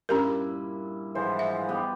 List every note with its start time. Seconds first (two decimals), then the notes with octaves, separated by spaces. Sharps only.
0.09 G2 A#2 C#4 E4 G4 A#4
1.15 G#2 E3 F3 C5
1.39 E5
1.69 B3 G4